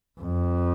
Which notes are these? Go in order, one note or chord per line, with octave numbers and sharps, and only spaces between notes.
F2